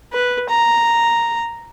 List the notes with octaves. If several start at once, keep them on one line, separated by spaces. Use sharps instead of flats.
B4
A#5